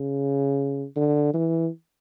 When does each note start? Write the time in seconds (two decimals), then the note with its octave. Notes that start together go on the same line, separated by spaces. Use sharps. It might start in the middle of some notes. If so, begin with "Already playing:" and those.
Already playing: C#3
0.96 D3
1.34 E3